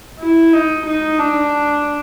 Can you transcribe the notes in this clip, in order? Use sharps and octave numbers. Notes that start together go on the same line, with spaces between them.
E4
D#4
D#4
D4